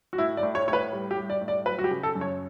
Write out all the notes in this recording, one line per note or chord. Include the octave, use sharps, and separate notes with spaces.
F#4
A2 E4
D5
A2
C#5
A2 C#5
B4
G3
G4
G3
D5
A2
D5
F#3 B4
F#4
G4
C#3
A4
F#2
C#5